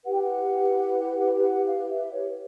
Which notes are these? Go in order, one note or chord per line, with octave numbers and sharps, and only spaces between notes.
E4 G4 B4 F#5
G5
F#5
G5
F#5
F5
E5
C#5